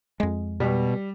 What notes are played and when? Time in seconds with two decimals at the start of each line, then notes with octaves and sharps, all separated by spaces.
0.20 F2 G#3
0.60 B2 G3